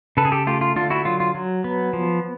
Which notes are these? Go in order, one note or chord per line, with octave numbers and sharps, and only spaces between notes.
C#3 A4 B4
G#4
G4 A4
A3 F4 G4
F4
D3 F4
E4 F#4
F#3 F4
F4
F#3
B3
F3